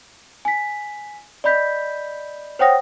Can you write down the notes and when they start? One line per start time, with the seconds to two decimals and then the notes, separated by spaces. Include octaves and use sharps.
0.45 G#5 B6
1.44 D5 D#5 B5 G6 B6
2.59 C5 C#5 F#5 G5 D#6 A#6